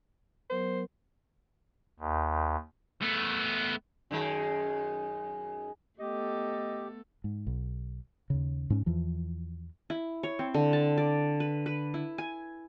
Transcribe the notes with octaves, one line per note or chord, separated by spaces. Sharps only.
F#3 B3 A#4 C5
D#2
A3 B3
F#2 D#3 G#3
A3 B3 G4 A4 D#5
G#2
B1
D#2 C#3
G#2 C#4
E2 E3 F3
E4
C#5
C4
D3
A5
D5
B4
B4
E4
G#5